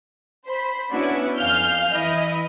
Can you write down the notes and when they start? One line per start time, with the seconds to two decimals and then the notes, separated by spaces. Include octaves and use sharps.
0.46 C5 B5
0.92 B3 C#4 D4 E4 F#4 B4
1.38 F2 F5 G#5 F6 G6
1.92 E3 E4 D#5